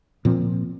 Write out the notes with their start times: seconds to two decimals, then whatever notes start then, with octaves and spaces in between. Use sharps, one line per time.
0.25 A#2 F3 C4